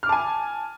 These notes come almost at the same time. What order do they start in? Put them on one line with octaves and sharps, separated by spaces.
F6 D6 A5 G#5